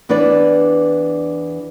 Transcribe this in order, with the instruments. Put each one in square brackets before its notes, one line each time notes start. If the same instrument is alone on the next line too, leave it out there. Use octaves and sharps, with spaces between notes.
[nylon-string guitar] E2 E3 D4 B4 D5